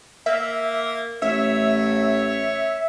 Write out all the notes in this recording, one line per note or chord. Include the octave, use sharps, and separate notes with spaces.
A#3 E5
A1 C#5 E5